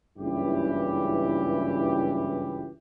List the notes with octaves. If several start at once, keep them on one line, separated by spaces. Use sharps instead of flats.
F#1 C#2 G2 E3 E4 G4